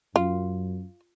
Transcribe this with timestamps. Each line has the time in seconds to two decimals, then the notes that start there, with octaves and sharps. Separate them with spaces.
0.16 F#2 F4